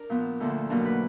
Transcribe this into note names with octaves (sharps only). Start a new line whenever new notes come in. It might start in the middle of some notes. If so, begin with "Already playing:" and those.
Already playing: D4 A#4
A#2 F3 B3
D2 D3 F3 A#3
B2 F#3 A#3 D4 A#4
B4